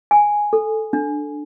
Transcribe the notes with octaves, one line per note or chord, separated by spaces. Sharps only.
G#5
A4
D4